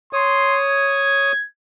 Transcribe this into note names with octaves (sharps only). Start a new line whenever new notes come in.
C#5 C6 D#6
G#6